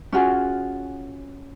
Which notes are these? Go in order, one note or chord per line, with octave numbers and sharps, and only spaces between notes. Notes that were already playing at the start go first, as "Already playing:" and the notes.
C#4 F4 F#4 G#4